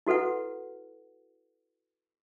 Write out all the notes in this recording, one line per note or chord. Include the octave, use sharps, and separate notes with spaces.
E4 F#4 A4 B4 F#5